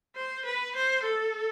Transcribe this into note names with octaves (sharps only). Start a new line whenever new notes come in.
C5
B4
C5
A4